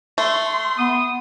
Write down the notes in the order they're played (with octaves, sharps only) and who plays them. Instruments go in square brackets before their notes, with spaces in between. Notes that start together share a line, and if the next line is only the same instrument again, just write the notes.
[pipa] A3 [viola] C6
[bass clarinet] B3 [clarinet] D#6